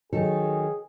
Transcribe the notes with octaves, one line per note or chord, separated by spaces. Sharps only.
D#3 F#3 G#4 A4